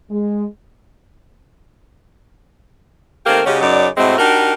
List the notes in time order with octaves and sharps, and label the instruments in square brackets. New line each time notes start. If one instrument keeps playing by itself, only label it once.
[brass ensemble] G#3
[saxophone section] D#3 A3 A#3 C4 G4 A#4
C#3 G#3 C#4 D#4 F#4 G4
F#2 C#3 F#3 D#4 D5
A2 C3 G#3 A3 C4 F#4
D4 D#4 F#4 G4 A#4